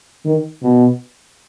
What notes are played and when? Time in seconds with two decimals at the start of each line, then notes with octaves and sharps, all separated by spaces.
0.25 D#3
0.62 B2